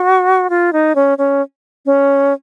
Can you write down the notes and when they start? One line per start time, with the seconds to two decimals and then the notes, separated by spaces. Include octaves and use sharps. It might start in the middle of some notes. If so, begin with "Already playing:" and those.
Already playing: F#4
0.50 F4
0.73 D#4
0.95 C#4
1.18 C#4
1.86 C#4